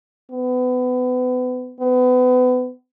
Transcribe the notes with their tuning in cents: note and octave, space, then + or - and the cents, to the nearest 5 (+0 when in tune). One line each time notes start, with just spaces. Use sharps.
B3 +30
B3 +30